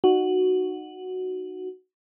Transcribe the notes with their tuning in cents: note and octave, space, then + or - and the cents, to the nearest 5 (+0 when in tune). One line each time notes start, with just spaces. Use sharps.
D#4 -20 F#4 +0